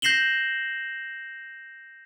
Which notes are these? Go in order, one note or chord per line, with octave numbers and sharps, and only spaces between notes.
G6 A#6 C7 E7 F#7 G7